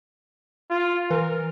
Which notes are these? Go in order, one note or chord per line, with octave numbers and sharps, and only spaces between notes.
F4
E3 A#4